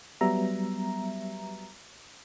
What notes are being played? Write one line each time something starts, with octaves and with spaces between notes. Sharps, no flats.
F#3 G3 B3 E5 A#5